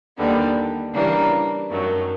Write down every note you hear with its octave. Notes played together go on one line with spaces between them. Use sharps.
D#2 D3 G3 B3
C#3 E3 G3 A#3 D4
F#2 D#3 F#3 A3